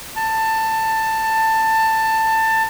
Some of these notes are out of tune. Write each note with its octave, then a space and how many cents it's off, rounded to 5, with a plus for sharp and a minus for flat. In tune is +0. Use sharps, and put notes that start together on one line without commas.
A5 +15